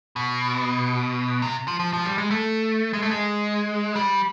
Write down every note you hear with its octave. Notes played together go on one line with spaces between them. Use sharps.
B2
C3
F3
F3
F3
G3
G#3
A3
G#3
A3
G#3
G3